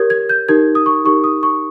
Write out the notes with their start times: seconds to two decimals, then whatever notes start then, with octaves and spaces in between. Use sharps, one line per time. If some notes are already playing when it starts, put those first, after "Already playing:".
Already playing: G4 A#4 C#5 G#6
0.10 G#6
0.29 G6
0.48 D#4 G4 A#4 G#6
0.75 D#6
0.86 C#6
1.05 D#4 G4 A#4 C#6
1.24 D#6
1.43 C#6